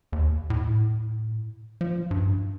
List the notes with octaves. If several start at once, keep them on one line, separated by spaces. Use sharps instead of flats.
D#2
A2
F3
G2